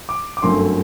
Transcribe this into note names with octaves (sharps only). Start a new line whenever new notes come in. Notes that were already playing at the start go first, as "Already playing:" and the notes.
D6
D6
G1 F#2 F#3 A3 C4 C6